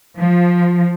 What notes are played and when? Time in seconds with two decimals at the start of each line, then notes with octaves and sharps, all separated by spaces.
0.18 F3